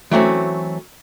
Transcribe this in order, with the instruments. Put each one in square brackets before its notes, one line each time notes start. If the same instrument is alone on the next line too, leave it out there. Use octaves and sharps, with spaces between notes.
[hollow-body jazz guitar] E3 F#3 A3 C4 C#4